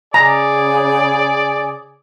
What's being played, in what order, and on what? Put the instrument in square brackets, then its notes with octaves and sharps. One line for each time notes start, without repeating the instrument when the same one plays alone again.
[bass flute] C#3 [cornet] G#4 [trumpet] D5 [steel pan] A#5